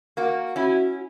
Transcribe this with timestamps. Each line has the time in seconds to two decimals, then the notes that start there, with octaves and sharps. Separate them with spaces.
0.17 A#3 F#4
0.56 C#4 E4 F#4